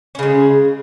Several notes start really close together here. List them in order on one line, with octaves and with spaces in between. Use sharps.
C#4 C#3 G#3